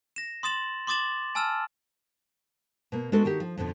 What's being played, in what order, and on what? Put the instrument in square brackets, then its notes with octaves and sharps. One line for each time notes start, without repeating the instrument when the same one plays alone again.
[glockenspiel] A#6 E7
C6 D#6 A6 E7 F#7
C6 D6 D#6 A6 E7 F#7
G#5 A5 E6 F6 E7
[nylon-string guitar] B2 A#3
G#3 B3 D4 F#4 A4
D#3 F#4 G4
F3
F2 B2 D3 E3 F3